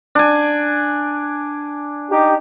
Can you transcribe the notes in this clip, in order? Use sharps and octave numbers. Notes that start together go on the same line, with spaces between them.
D4 G#5
D#4 G4